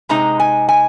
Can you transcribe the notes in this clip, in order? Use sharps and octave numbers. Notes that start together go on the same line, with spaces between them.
C3 G#3 D#4 A#5
G#5
G#5